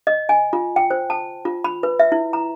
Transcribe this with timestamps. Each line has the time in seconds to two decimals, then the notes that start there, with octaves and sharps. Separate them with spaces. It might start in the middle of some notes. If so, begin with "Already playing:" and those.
0.07 D#5
0.29 G#5
0.53 F4
0.76 G5
0.90 C5
1.10 A5
1.45 F4
1.64 B5
1.83 B4
2.00 E5
2.12 E4
2.33 A#5